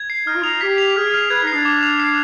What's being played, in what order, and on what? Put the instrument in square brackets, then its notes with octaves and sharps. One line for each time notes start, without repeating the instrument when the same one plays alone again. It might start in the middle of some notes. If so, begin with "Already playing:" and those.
Already playing: [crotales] G#6
C7
[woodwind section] D#4 [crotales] F6
[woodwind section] F4
[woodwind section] D#4 [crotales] F7
[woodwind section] G4 [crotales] B6
[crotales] F7
[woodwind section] G#4 [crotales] F6
[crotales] F6
[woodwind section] B4 [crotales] G#6
[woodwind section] D#4
[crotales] C7
[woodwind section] D4
[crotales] D6
F7
C7